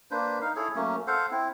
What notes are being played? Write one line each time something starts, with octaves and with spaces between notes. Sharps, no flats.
A#3 D4 B4 C5
D#4 F5
E4 G#4 A4 C#5
F#3 A3 A#3 C#4
A4 C5 F5 F#5
C4 E4